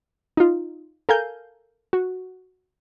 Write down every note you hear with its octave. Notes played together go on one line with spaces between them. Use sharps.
D#4 F4
A4 A#4 F5 G#5 G6
F#4